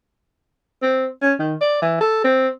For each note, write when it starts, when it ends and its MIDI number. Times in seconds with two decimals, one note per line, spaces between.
0.82 1.07 60
1.22 1.33 61
1.39 1.55 51
1.61 1.80 74
1.82 1.98 52
2.01 2.21 69
2.24 2.48 60